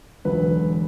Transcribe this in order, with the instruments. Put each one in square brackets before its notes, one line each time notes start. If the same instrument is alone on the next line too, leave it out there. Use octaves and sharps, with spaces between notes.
[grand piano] E1 E2 D3 F#3 B4